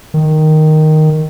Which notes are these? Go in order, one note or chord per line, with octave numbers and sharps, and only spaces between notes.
D#3